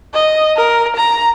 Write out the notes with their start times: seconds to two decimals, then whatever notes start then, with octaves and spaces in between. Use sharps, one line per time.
0.14 D#5
0.57 A#4
0.96 A#5